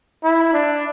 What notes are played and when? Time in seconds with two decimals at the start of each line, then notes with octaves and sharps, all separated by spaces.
0.24 E4
0.53 D4